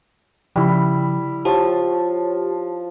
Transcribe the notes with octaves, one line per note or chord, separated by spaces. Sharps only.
C#3 F3 G3 E4
F3 G4 C#5 A5